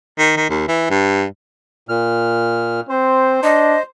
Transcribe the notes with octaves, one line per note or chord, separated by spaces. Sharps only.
D#3
D#3
D#2
E3
G2
A#2 F6
C4 C5
D4 D#5